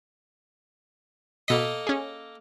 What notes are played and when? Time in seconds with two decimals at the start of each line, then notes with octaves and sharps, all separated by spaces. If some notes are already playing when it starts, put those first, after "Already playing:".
1.48 B2 A#3 A4 D#5 B6
1.87 C#4 G#4